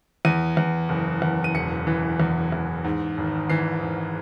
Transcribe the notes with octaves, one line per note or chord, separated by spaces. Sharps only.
E2 D#7
E2
F#1
E2
D#7
E1 C#7
E3
E2
E2
G#2
G#1
E3 C7
G#1